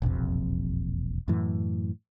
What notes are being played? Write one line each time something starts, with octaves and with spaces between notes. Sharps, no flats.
E1 A#1 F2 C3
F#2 A2 E3